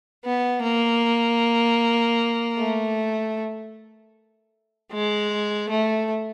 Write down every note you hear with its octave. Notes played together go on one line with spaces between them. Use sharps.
B3
A#3
A3
G#3
A3